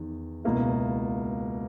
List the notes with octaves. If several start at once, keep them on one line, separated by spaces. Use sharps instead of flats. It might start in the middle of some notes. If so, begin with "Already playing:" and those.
Already playing: E2 D#3
C#2 B2 A#3 E4